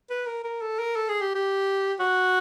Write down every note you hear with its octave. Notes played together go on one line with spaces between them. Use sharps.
B4
A#4
A#4
A4
A#4
A4
G#4
G4
G4
F#4